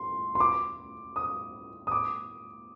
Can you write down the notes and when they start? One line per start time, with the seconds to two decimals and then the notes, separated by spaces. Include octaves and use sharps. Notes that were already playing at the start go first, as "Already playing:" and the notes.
Already playing: C6
0.35 C6
0.40 D6
1.16 D#6
1.87 D#6
1.92 D6